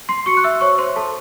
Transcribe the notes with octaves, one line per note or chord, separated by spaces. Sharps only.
C6 C7
F#4 C#6 C#7
F#6
E5 E6
C5 C#5 C#6
C5 C6
A4 A5